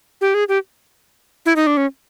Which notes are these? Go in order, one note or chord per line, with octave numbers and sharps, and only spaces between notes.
G4
G#4
G4
E4
D#4
D4
C#4